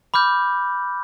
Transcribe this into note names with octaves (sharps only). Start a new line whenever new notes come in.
B5 D6 F6 G6